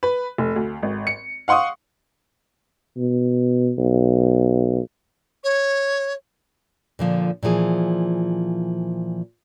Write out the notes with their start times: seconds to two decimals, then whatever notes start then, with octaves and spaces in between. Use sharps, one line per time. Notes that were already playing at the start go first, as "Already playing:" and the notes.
0.03 B4
0.38 F1
0.56 D2
0.83 G#1
1.07 C#7
1.48 F5 F#5 C6 C#6 D#6
2.97 B2
3.78 B1
5.43 C#5
6.99 A#2 D3 F3
7.43 A#2 E3 F3 G#4